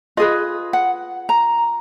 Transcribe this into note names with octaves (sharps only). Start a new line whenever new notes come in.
F4 G#4 B4 D#5
F#5
A#5